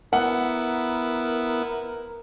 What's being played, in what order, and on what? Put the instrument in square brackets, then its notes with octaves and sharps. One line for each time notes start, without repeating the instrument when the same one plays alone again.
[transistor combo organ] B3 E4 [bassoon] A#4 [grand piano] F#5